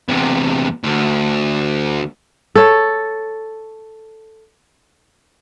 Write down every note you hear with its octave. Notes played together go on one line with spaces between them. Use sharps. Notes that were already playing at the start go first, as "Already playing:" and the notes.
E2 C3
D2
A4 C#5